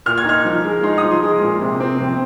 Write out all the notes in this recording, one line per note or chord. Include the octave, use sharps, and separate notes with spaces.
A#2 F6
G#6
D#4 F6
F3
G#3
D#4 C6
F3 D#6
C6
G#3
A#2
C3
C4
F2